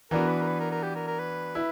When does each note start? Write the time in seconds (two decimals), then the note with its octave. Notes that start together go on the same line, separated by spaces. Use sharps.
0.11 E3 B3 D4 F#4 A#4
0.29 B4
0.41 A#4
0.47 B4
0.60 A#4
0.72 A#4
0.83 G4
0.96 A#4
1.07 A#4
1.19 B4
1.55 E4